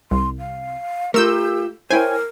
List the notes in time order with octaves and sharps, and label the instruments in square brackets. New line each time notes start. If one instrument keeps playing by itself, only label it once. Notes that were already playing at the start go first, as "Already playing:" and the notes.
[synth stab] C2 [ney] C6
[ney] F5
[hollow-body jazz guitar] A3 F4 [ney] G4 [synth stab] A#4 E6 G6
[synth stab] E4 G#5 [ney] A#4 [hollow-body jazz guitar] C5 C#5 G5